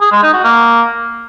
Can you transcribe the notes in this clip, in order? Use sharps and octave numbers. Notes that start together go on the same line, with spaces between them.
G#4
G#3
D#4
F#4
A#3